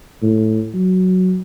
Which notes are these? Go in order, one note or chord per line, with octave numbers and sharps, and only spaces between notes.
A2
F#3